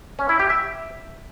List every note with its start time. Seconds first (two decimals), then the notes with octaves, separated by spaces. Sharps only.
0.19 C#4
0.29 E4
0.40 G4
0.50 E5